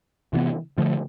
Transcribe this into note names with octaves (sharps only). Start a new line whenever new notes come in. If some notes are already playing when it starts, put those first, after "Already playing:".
C3 E3 B3
D3 F3 A3